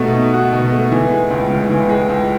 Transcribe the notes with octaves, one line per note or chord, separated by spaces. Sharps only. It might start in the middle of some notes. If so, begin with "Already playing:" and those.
Already playing: B2 A3 D#4 F#4
D#4
F#4
B2
A3
E3
G#3
C#2
C#3
E3
G#3
C#2